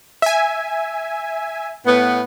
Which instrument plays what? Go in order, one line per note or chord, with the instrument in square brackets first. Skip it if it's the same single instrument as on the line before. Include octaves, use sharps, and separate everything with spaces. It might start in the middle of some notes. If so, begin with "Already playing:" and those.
[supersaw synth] E5 G#5
[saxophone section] A2 B3